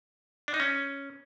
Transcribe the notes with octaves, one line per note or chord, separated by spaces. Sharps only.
D4
D#4
C#4